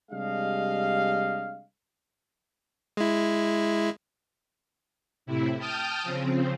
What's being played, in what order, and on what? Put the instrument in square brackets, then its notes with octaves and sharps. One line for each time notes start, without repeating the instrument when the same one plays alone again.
[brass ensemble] C3 G3 G#3 D4 D#5 F5
[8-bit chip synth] G#3 E4
[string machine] A2 C3 E4
G5 A5 D#6 F6 G6
C#3 F3 C4